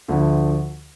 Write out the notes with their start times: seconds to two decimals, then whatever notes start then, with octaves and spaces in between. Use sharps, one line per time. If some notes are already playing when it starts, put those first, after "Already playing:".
0.08 D2 D3 F3 A3